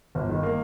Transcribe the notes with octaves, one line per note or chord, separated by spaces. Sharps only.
G1
D#3
A#3